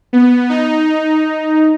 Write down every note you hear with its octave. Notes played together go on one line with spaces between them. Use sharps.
B3
D#4